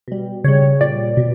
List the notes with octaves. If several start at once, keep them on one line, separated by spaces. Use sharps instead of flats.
B2 G3
C#3 G3 C#5
A#2 G3 D5
B2